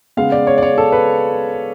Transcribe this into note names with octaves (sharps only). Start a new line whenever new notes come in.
C#3 G#3 B3 F5
D5
C#5
D5
C#5
A4
B4